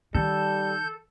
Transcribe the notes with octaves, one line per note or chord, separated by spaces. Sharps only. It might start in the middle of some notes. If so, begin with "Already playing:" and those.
D#3 G3 A4 G6